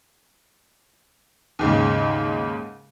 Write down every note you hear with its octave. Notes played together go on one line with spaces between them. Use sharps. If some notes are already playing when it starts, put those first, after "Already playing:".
D#2 G#2 C#3